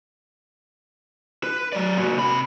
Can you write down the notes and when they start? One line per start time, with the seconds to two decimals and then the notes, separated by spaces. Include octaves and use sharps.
1.43 B4
1.73 F#3 D5
1.97 A#3 F#4
2.16 C3 B5